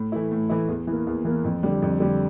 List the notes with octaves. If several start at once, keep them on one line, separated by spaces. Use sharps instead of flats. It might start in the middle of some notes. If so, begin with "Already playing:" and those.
Already playing: A2
E3 A3 E4
A2
E3 A3 E4
E2
E3 A#3
E2
E3 A#3
F2
D3 G3
F2
D3 G3